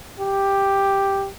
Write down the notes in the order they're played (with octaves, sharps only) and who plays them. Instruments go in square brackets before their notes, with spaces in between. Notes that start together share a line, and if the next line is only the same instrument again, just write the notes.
[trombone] G4